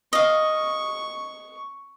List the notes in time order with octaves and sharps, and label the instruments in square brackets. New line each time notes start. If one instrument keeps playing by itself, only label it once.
[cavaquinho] D#5 F5 [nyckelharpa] C#6